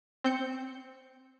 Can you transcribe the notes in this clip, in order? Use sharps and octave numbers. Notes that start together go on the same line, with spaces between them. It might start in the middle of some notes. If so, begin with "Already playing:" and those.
C4 G6 C#7